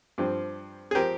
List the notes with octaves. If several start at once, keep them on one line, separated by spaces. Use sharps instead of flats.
G2 F3 C4
G#4
F3 C4 G4 A#4